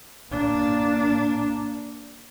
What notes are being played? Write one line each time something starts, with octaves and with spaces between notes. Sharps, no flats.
A#3 D4